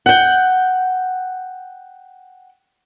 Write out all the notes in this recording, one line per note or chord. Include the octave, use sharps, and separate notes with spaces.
F#5 G5